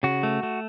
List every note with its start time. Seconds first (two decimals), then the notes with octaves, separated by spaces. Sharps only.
0.03 C#3 F#4
0.23 A3
0.43 A3